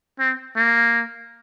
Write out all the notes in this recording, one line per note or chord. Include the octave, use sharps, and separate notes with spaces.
C4
A#3